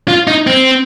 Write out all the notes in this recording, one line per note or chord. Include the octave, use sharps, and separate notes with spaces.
F4
D#4
C4